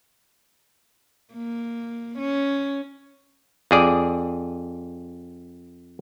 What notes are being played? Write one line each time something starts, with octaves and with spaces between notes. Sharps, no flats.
A#3
C#4
F2 G#4 D5